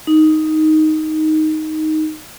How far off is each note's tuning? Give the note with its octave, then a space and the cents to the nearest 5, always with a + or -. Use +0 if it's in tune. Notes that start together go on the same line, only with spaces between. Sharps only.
D#4 +5